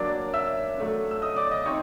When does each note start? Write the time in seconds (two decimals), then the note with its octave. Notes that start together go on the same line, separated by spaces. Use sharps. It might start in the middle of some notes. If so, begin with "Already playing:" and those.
Already playing: F#3 A#3 D4 D5 D6
0.34 E5 E6
0.77 F#3 A3 D4
1.11 E6
1.22 D#5 D#6
1.36 D5 D6
1.51 D#5 D#6
1.66 C4 D#4 C#5 C#6